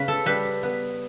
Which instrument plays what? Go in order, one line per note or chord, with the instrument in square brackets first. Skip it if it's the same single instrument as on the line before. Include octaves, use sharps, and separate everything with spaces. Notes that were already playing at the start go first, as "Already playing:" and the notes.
Already playing: [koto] C#3 B4
A4
G3 B4
B3